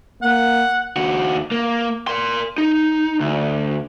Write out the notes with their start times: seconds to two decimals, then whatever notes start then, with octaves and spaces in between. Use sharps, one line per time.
0.22 A#3 F#5
0.96 D#2 F#4
1.52 A#3
2.07 A#4 C6
2.58 D#4
3.20 D2